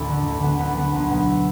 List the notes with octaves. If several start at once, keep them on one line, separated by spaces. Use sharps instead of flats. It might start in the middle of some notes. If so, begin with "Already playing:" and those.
Already playing: A1 D2 A2 D4 E4 F#4
D3
D2
D3 B3
D2 B3
D4
D3 B3
B1 B3
B2 B3
E4